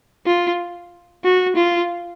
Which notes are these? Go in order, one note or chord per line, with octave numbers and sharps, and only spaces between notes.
F4
F#4
F4